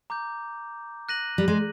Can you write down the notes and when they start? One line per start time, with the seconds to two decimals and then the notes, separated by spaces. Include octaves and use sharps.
0.10 A#5 D6 G6
1.09 F#6 A#6 D#7 F#7
1.38 G3
1.48 G#3